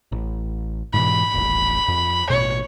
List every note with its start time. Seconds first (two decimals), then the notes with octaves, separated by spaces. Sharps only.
0.12 A1
0.94 G#2 B2 E3 B5
1.34 D#1 A1
1.88 F2
2.30 A1 B2 C#5